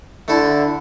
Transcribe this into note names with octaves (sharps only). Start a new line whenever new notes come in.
D3 A3 E4 A4